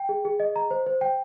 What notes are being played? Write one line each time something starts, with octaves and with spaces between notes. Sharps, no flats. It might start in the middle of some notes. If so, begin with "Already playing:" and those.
Already playing: G5
G#4
G#4
D#5
A#5
C5
C5
G5